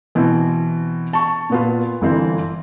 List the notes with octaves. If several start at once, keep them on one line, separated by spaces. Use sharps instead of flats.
B2 E3 C4
A5 C#6
A#2 B3 F4
G1 E3 C4